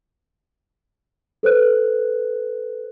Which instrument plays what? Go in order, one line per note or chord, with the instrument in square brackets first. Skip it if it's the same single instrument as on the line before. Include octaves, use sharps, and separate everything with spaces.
[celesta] A4 B4 C5 F#6